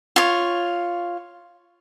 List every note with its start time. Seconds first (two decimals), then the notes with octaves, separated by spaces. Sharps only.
0.16 F4 C#5